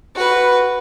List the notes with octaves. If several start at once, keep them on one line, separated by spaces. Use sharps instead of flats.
F#4 B4